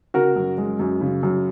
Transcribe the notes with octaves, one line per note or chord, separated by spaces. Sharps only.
C#3 F#4 A#4
F#2
G#3
F#2
C#3
F#2